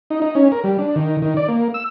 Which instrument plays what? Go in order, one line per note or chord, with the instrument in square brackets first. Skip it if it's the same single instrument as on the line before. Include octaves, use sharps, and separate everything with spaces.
[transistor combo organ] D#4
D#4
C#4
A#4
G3
D4
D#3
D#3
D5
A#3
E6